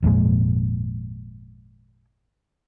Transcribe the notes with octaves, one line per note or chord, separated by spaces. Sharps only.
G#1 F2 A#2 G#3